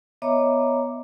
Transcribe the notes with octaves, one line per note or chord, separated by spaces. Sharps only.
B3 C#5 D#5 E5 A#5 D6